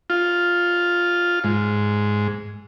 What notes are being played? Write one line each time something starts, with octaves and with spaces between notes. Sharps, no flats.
F4
G#2